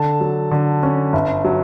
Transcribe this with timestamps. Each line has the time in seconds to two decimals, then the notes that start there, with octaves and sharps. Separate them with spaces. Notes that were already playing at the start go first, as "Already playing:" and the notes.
Already playing: D3 A4 A5
0.21 F#3
0.51 D3
0.83 C#4
1.13 G1
1.44 F#3